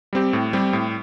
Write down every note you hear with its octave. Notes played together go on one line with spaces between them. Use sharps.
G3 C4 G4
A2
G3 C4 G4
A2